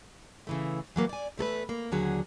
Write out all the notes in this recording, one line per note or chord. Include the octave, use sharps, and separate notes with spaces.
C#3 E3 A3
E3 F#3 A#3
D5 G#5
E2 A3 A4 B4
A#3
D#2 D3 F#3 G#4